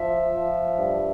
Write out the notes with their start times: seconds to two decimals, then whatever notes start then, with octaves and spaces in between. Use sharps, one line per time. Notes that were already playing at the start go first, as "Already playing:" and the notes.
Already playing: F3 E5
0.33 F3
0.78 G2